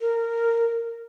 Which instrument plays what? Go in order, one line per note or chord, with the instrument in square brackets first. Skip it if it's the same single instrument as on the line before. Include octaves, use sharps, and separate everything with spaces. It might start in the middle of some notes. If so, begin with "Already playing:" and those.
[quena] A#4